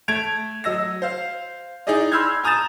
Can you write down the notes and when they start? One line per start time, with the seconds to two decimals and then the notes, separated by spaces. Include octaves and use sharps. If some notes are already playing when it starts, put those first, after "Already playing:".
0.08 A3 G#6 D7 F7
0.64 F#3 D#5 E6 A#6
1.02 C5 F5
1.87 D#4 E4 G#4 D5 D#5
2.12 B5 C6 E6 F6 G6 G#6
2.44 G#5 A#5 D#6 G6 A6 E7